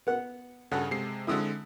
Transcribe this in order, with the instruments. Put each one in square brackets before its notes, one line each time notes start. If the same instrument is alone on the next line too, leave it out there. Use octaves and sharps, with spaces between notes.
[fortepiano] B3 F#5
[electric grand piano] G2 C#3 [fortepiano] G#4 A4 F#5
[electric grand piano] C3 G#3 C7
[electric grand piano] D3 G#3 C4 [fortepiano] E4 D#6 E6